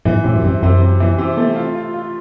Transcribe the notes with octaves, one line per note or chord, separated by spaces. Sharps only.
G#2 E3
A2 C3
F#2
G2 C3
F#2 C3
C3
E3
C3
A3
F4
F4
F4